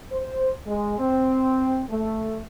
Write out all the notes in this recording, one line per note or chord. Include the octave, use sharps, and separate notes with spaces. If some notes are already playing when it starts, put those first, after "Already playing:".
C5
G#3
C4
A3